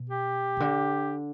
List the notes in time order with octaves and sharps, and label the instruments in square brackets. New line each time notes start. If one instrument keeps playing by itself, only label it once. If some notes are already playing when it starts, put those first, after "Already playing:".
Already playing: [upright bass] B2
[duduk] G4
[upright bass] C3
D3